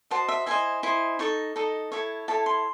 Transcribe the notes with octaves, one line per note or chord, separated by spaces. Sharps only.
F#4 C5 D#5 A5
E5
E4 C5 D#5 G#5
E4 C5 D#5
D#4 A4 D#5 C#6
D#4 A4 D#5
E4 A4 C#5
E4 A4 C#5 A5
C6